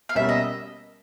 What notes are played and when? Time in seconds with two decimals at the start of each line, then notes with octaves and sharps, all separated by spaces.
0.09 F5
0.15 B2 G3 A#3 C#4 E5
0.29 D#5